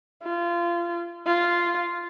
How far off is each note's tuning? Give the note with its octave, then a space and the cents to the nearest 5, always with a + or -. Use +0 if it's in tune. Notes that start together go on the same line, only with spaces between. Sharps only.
F4 -25
F4 -10